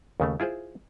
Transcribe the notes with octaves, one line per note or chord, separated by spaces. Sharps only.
D#2 C#3 A3
E4 F4 G#4 C5